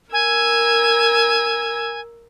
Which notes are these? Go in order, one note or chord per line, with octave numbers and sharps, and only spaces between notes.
A#4 G#5 E6 G#6